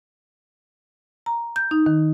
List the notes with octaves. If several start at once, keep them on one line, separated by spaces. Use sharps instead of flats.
A#5
G6
D#4
D#3